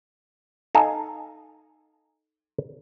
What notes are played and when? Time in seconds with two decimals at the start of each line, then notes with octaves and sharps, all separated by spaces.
0.75 D#4 A4 F5 G#5